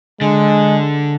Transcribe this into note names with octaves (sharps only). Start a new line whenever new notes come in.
D3 G#3